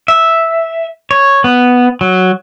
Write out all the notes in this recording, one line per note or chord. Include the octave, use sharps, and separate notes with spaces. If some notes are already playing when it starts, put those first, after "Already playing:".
E5
C#5
B3
F#3